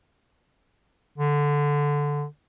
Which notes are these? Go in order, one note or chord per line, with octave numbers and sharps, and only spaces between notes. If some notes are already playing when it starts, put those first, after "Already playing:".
D3